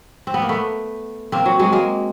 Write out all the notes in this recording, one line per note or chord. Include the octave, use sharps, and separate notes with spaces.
C4
B3
A#3
A3 B3
A#3 C4
F#3
F#3 G#3
G#3 A#3